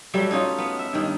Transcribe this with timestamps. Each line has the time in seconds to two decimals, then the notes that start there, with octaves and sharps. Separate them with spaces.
0.14 F#3 G3 A3
0.31 C#4 D#4 F4
0.58 B3
0.79 E5
0.93 G2 D#3